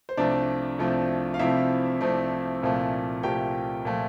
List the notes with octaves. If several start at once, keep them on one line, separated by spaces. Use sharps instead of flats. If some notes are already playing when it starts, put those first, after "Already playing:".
C5
C2 C3 F3 A3 C4 D4 D5
C2 C3 F3 A3 C4
F5
C2 C3 F3 A3 C4 E4 E5
C2 C3 F3 A3 C4
C2 A#2 F3 A3
C2 A#2 F3 A3 G4 G5
A#2 F3 A3